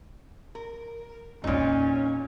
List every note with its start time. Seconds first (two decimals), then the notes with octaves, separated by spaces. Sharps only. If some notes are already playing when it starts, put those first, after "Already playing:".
0.55 A#4
1.44 E2 A#2 C4 C#4 D#4